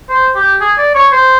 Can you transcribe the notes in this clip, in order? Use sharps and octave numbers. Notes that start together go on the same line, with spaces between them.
C5
G4
G#4
D5
C#5
C5